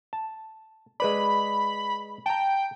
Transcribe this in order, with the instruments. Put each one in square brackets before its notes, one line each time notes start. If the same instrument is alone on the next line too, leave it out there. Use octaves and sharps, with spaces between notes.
[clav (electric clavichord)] A5
[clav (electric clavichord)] G#3 B4 D5 [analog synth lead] B5
[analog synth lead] G5 [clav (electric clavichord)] A5 A#5